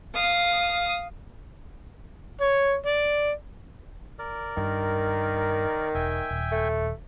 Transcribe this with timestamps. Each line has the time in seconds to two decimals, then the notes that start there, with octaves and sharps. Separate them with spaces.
0.14 F5 D#6
2.41 C#5
2.87 D5
4.19 A#4 D5
4.57 G2 D#3
5.95 E1 E5 G5 G#5
6.31 D#1
6.52 A3